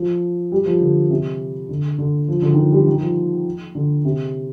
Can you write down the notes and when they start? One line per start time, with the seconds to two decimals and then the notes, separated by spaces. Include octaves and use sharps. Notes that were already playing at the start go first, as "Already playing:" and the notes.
Already playing: F3
0.52 G3
0.66 F3
0.81 D3
1.10 C3
1.69 D3
1.99 D3
2.28 F3
2.42 D3
2.53 D#3
2.57 F3
2.72 G3
2.87 D#3
3.01 F3
3.75 D3
4.05 C3